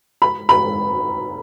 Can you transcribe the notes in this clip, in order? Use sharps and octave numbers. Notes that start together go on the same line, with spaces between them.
B5
B5